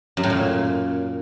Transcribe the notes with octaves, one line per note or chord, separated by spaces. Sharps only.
F#2
A2
A#2